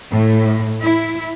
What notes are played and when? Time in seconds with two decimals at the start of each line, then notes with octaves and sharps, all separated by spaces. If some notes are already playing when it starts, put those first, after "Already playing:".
0.12 A2
0.83 E4